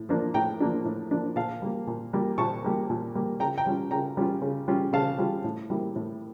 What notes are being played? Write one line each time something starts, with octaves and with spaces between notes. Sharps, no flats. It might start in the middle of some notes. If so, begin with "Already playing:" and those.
Already playing: A2
F3 A#3 D4
A2 G5 A#5
F3 A#3 D4
A2
F3 A#3 D4
A#2 F5 A5
G3 A#3
A#2
G3 A#3
A#2 A5 C#6
G3 A#3
A#2
G3 A#3
C#3 G5 A#5
G5 A#5
G3 C#4 F4
C#3 G5 A#5
G3 C#4 F4
C#3
G3 C#4 F4
C#3 F5 A5
G3 C#4 F4
A2
G3 A#3 E4
A2